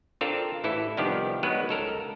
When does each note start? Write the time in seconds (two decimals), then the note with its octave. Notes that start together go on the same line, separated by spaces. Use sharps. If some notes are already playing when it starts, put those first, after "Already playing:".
0.21 C4 D4 F4 A4 A#4
0.64 A1 E3 E4 A4
0.97 C2 D#3 F3 B3 D4 G4
1.43 D#3 F#3 G#3 B3 B4
1.69 C#2 A4 A#4